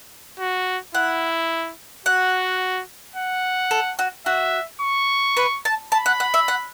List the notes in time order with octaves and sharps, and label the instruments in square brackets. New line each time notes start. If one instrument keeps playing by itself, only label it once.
[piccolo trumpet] F#4
[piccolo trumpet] E4 [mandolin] F#5
[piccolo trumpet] F#4 [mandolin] F#5
[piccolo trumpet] F#5
[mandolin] A4
F#4
[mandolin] F#4 [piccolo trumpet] E5
[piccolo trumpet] C#6
[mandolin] B4
A5
[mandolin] A5 [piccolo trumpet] B5
[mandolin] F#5
F#5
E5
F#5